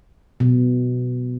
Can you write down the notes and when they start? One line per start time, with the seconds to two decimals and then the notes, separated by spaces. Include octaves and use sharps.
0.40 B2